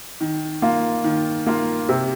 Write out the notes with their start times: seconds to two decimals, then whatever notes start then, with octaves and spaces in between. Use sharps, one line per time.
0.21 D#3
0.62 A#3 F4
1.04 D#3
1.47 A#3 F4
1.89 C3